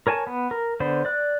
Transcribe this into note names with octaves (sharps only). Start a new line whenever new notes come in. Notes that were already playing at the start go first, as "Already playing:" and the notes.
A#4 C#5 G#5 A5
B3
A#4
D3 B3 C5 D5
D5 F#6